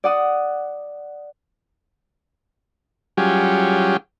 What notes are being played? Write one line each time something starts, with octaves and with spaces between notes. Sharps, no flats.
D5 F#5 D#6
F#3 G3 C#4 F4 G4 G#4